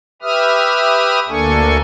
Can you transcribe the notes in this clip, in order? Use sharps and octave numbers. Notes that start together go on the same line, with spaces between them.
G4 B4 E5 D#6 F6
D2 A#3 D4 A4 G#5 C#6